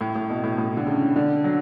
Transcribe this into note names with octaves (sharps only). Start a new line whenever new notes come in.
A2
A2
B2
A2
A2
D3
C#3
D3
F#3